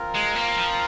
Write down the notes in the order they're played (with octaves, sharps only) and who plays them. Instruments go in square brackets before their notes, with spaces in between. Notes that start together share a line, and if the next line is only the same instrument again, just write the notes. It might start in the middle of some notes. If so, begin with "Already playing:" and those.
Already playing: [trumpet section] C4 F4 A#4
[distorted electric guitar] G#3
A#3
F3